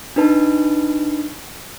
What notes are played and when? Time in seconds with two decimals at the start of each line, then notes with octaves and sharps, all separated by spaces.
0.16 D4 D#4 B4 A5